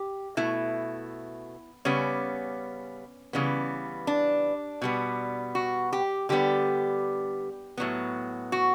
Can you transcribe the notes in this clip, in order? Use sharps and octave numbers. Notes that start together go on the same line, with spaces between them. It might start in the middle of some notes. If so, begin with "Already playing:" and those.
Already playing: G4
B2 A3 E4
C#3 G3 B3 C#4
C#3 E3 G3 B3
D4
B2 G3 B3
F#4
G4
D3 G3 B3 G4
A2 F#3 B3
F#4